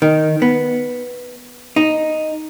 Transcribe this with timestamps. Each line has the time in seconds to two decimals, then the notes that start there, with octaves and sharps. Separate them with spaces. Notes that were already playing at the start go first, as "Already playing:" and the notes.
0.02 D#3
0.42 B3
1.76 D#4